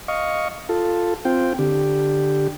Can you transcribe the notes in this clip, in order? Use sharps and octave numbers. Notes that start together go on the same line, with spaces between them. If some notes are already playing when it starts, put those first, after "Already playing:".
D#5 F5 C#6
F4 A4
C4 F4 G5
D3 G4